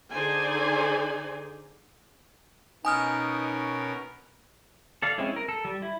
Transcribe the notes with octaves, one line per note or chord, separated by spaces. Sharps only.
D3 D#4 G#4 C5 D5 G#5
B2 C#4 D#4 A#4 G#5 D#6 F6
A4 D5 F5
G#3 C4 C#4 E4
A#4
A4
G3
E4